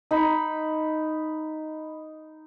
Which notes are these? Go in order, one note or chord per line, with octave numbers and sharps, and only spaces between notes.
D#4 B5